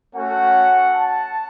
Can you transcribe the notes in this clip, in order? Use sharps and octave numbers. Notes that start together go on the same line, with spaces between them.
A3 C#4 F#4 F#5
A5